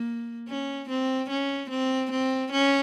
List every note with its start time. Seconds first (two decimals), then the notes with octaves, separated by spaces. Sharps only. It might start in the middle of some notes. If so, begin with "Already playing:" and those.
Already playing: A#3
0.48 C#4
0.89 C4
1.30 C#4
1.70 C4
2.11 C4
2.52 C#4